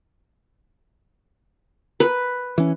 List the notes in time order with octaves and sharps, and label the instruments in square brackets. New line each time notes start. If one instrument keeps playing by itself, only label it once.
[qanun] B4
[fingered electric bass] E3 C#4